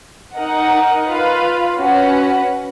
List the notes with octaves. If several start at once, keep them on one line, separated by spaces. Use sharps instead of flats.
D#4 A#4 D#5 F#5
F4 B4 F5
C#4 F#4 B4 F#5